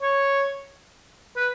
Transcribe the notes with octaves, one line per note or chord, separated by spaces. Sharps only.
C#5
B4